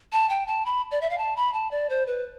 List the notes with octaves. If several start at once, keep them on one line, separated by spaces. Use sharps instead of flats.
A5
G5
A5
B5
D5
E5
F5
A5
B5
A5
D5
C5
B4